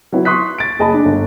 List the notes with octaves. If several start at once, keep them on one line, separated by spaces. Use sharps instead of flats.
F#3 B3 E4
C6 C#6 D#6 F#6 B6
A6 D7
F#1 G#4 D#5 A5 B5
D4
G1